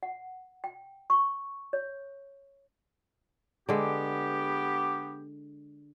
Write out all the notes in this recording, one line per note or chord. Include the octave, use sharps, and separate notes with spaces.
F#5
G5
C#6
C#5
D3 G#3 B3 G4